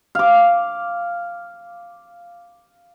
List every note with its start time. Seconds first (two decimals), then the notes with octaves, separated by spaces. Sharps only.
0.15 F5 D6